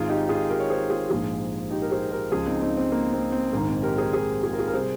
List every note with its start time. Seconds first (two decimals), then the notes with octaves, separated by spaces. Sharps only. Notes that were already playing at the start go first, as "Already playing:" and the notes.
Already playing: G#1 G#2 D#3 F4 G#4
0.09 D#4 G4
0.29 F4 G#4
0.50 G4 A#4
0.60 C#5
0.70 G#4 C5
0.90 F4 G#4
1.10 A#1 G#2 F3 F4 G#4
1.70 D#4 G4
1.82 A#4
1.91 G#4 C5
2.11 G4 A#4
2.31 C#2 C#3 F3 F4 G#4
2.47 C4 D#4
2.61 C4 D#4
2.77 C4
2.92 A#3
3.13 C4
3.32 C4
3.53 A#1 G#2 D#3 A#3
3.68 C4
3.83 G4 A#4
3.98 G#4 C5
4.13 G#4 C5
4.43 F4 G#4
4.53 A#4
4.58 F4 G#4
4.68 A#4
4.74 C3 G3 G#4 C5